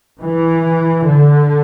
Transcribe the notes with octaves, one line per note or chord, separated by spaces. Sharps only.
E3
D3